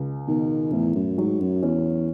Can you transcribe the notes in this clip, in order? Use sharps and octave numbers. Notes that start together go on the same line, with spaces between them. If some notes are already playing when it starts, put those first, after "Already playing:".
Already playing: C#2
B2 D#3
E2 A2
F#2
G#2 F#3
F#2
E2 C#4